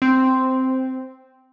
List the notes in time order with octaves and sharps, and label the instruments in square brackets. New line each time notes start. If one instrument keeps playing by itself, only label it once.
[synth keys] C4